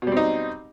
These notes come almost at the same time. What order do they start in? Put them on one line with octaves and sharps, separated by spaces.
B2 G3 C4 D#4